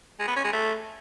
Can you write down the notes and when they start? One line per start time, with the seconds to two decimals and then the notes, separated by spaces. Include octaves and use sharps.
0.20 G#3
0.28 B3
0.36 C#4
0.44 G#3
0.53 A3